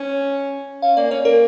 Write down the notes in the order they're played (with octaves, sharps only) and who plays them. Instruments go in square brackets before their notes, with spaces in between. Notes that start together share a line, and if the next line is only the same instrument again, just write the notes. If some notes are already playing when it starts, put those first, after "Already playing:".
Already playing: [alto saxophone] C#4
[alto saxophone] C#4 [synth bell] F5
[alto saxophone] A#3 [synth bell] D5
[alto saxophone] C#4 [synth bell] C#5
[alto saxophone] A#3 [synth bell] A#4